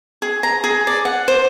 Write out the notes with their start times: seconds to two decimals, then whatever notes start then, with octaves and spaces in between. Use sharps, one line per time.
0.22 G#4
0.43 A#5
0.64 G#4
0.87 D5
1.05 F#5
1.28 C5